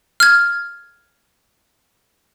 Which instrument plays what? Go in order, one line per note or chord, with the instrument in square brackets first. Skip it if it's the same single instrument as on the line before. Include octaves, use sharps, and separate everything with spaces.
[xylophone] F6 G#6